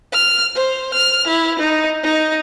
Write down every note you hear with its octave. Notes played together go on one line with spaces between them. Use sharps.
F6
C5
F6
E4
D#4
D#4